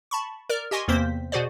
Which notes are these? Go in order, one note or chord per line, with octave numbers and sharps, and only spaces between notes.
A5 B5 C#6
A#4 D5 F6
G4 D#5 G#5 C6 C#6
E2 C3 A#3 C4 C5 B6
B2 F#4 G#4 C5 D5